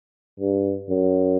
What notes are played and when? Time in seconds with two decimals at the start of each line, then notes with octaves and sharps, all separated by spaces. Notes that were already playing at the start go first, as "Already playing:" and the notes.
0.40 G2
0.90 F#2